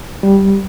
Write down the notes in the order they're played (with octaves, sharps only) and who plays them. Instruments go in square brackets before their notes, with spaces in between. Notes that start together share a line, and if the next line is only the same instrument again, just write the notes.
[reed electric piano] G3